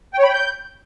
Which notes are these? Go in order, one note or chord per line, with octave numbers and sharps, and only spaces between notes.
G5
C#5
B5
G5
G6